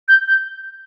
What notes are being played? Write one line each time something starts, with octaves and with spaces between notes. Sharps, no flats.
G6
G6